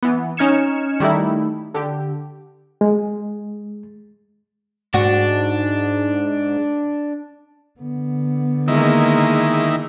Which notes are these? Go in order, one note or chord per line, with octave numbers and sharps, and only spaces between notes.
E3 B3
C#4 D#4 F6 G#6 C#7 E7
D#3 G3 A3 D#4 E4
D3 G4
G#3
G#2 D4 F#4
D3 B3
D#3 G#3 A#3 E4